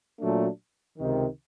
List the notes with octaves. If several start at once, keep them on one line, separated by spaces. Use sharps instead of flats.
A#2 F#3 A3 D4
C#2 C3 D#3